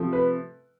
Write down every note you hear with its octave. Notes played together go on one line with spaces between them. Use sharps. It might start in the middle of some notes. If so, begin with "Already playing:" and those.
Already playing: C3 F3 A3
B4